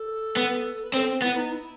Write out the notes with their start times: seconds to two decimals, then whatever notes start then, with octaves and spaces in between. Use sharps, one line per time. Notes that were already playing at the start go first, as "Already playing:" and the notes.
Already playing: A4
0.37 B3
0.83 B4
0.93 C4 A4
1.22 B3 E4
1.36 D#4
1.51 E4